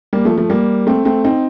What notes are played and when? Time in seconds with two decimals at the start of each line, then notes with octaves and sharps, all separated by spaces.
0.13 G3 A#3
0.25 F3 A3
0.38 F3 A3
0.50 G3 A#3
0.87 A3 C4
1.05 A3 C4
1.24 C4 D#4